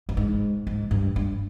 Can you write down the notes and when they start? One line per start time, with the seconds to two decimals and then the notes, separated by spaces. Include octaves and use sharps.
0.09 G2
0.17 G#2
0.67 G#2
0.91 G2
1.16 G2